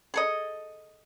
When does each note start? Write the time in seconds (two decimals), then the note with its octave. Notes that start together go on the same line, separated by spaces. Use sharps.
0.14 G#4 A4 D#5